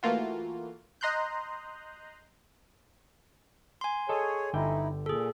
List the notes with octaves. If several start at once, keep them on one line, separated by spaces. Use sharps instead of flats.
E3 A3 A#3 F4 F#4
D#5 A#5 C6 F#6 G6
G#5 C6
G#4 A4 C#5 D#5 A5
G1 D3 D#4 E4 G5
A#2 G#4 A4